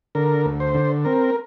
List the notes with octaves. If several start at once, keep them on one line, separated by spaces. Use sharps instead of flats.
D3 A#4
D2
C5
D3
C4 A#4